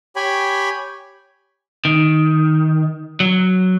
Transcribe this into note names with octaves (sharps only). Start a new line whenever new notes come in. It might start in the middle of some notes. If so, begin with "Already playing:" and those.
G4 C#5 G5 G#5 B5
D#3
F#3